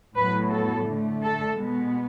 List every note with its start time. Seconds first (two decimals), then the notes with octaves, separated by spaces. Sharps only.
0.15 A2 F#3 B3 B4
0.51 A4
0.87 D3 A3
1.23 A4
1.58 B2 G#3 B3